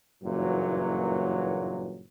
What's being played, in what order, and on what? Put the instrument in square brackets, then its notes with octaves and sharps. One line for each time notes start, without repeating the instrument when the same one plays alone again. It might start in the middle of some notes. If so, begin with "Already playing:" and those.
[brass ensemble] F#1 G2 A#2 E3 F#3